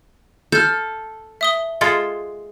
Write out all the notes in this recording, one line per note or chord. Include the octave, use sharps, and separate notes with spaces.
A4 F6 G6
E5 D#6 G7
G#3 F4 A4